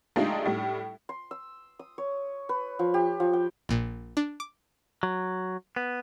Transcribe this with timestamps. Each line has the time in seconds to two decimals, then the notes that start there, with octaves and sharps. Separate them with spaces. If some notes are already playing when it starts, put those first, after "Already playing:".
0.16 G#3 A3 D4 D#4 F4 G4
0.45 A2 G3
1.09 C6
1.31 E6
1.79 D#6
1.98 C#5
2.49 B4
2.79 F3
2.94 G4
3.20 F3
3.33 G5
3.69 A#1 A#2
4.17 D4
4.40 D6
5.03 F#3
5.76 B3